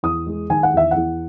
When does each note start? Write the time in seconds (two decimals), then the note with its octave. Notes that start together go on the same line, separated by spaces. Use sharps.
0.03 E2 D#6
0.27 G#3
0.50 D#3 G#5
0.63 F#5
0.73 E2 E5
0.91 E2 F#5